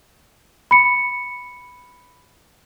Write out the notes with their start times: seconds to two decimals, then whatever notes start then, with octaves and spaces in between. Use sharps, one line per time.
0.71 B5 C#7